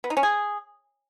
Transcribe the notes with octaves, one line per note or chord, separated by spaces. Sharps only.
B3
D#4
C#4
G#4